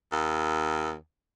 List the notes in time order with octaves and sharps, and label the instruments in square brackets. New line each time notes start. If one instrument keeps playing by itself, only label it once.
[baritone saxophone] D#2